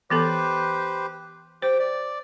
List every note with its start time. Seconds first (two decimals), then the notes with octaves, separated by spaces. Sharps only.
0.10 E3 B3 G4 A4 B4 C5
1.62 G4 C5 G5
1.79 D5